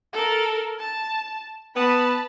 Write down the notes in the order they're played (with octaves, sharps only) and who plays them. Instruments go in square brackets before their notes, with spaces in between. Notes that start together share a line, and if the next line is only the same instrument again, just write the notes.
[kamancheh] A4 A#4
A5
[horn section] B3 [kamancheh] A5 B5